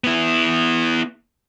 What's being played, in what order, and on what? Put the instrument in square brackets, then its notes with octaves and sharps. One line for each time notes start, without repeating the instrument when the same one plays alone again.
[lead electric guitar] B3 E4